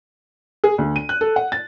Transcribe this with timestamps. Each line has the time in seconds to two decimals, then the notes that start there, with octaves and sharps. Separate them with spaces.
0.64 G#4
0.78 D2
0.96 D#7
1.09 F#6
1.21 A4
1.36 F#5
1.52 A6